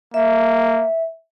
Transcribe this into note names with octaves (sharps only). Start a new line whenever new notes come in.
A#3 E5